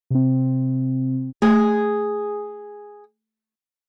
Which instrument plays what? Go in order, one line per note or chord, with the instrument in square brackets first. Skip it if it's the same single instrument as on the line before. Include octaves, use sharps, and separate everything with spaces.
[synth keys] C3 C4
[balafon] A3 [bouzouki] G#4